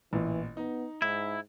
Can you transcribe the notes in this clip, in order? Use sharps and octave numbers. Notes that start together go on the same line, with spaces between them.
A1 A#2 E3
B3 D#4
G#2 E4